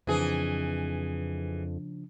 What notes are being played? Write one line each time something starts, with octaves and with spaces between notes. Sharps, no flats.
F2 C#3 E3 F3 D4 G#4